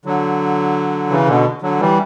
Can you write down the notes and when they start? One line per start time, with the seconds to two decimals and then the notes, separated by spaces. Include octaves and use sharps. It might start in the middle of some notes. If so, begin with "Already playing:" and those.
0.05 D3 F#3
1.10 C#3 E3
1.27 B2 D3
1.62 D3 F#3
1.80 E3 G3